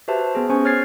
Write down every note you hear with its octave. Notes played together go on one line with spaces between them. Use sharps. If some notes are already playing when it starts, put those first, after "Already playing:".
F#4 G4 B4 C5 E5 A5
B3 G#4
C#4 C5 G#5 C#6
C#5 F6 G#6 A6 C7